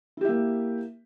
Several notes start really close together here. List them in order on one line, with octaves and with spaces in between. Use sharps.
E4 G4 E5 A#3